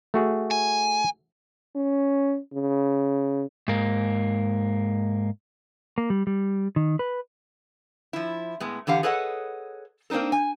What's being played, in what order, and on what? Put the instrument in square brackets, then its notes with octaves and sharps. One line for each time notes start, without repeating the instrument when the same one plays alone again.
[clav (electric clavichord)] A3 F#4 G#4
[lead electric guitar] G#5
[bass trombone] C#4
C#3
[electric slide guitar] G#2 A#3
A#3
G3
G3
D#3
B4
[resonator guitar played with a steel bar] F3 E4
A2 G#3 B3
D3 E3 G4 F5 F#5
G#4 A4 B4 C#5 D#5 F#5
A#3 C4 D4 D#4 A4
G#5